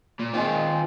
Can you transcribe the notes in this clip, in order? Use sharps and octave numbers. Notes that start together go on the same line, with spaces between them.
A#2
D#3 G#3 C4 F4